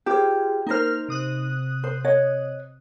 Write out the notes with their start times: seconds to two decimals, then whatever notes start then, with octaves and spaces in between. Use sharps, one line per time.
0.06 F4 G4 G#4 C5
0.67 A#3 D#4 A#4 C5 F6
1.08 C3 D#6 F#6
1.84 C5
2.05 C#5 D#5